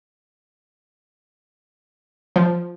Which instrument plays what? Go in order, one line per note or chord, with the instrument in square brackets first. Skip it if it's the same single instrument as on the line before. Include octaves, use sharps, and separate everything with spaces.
[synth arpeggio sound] F3